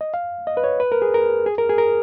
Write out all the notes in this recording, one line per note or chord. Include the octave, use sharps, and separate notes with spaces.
D#5
F5
D#5
B4
C#5
B4
A#4
G#4
A#4
G#4
A#4
G#4
A#4